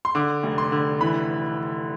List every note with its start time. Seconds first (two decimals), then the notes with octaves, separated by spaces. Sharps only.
0.05 C6
0.15 D3 D6
0.43 F1
0.58 C6
0.72 D3
1.01 E3 B5